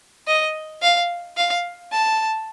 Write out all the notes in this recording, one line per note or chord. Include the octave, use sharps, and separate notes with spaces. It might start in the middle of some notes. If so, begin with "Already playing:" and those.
D#5
F5
F5
A5